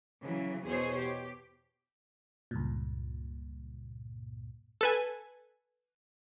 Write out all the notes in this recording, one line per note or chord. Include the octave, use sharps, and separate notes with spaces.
C#3 E3 F#3
E2 B2 G#4 C5 C#5
G4
C#2 G2 A#2
A4 B4 G#5